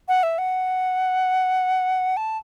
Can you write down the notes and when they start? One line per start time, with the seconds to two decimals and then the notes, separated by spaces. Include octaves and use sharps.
0.08 F#5
0.23 E5
0.38 F#5
2.17 A5